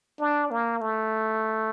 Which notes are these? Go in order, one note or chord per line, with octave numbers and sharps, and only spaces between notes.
D4
A#3
A3